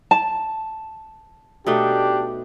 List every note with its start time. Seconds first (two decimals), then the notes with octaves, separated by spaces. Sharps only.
0.11 A5
1.67 B2 A3 D4 D#4 G4